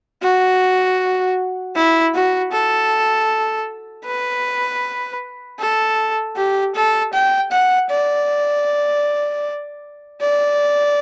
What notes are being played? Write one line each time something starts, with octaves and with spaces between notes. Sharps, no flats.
F#4
E4
F#4
A4
B4
A4
G4
A4
G5
F#5
D5
D5